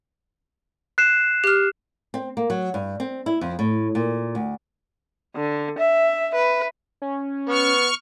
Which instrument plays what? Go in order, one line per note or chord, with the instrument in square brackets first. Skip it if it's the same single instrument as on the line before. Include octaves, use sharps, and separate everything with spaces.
[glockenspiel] F#6 C7 E7
[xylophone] G4 F6
[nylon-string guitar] C4
A#3
F#3
G2
C4
E4
F2
A2
A#2
D2
[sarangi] D3
E5
B4
[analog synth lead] C#4
[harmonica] B3 [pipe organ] C#6 F6